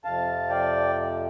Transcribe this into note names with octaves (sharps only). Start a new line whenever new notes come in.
F2 C3 F3 F5 A5
D5 G5